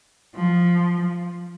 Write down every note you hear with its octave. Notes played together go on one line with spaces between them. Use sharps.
F3